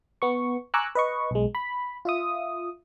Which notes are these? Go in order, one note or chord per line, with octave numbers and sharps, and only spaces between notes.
B3 C#6
G#5 A#5 C#6 D6 E6 F#6
B4 D#5 C#6
B1 G#3
B5
F4 E5 D#6